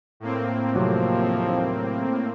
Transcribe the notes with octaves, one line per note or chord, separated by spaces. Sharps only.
A2 A#3 C4
D#2 C3 F3 F#3